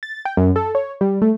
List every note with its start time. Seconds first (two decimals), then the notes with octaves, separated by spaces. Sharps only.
0.03 A6
0.25 G5
0.37 F#2
0.56 A4
0.75 C#5
1.01 G3
1.22 A3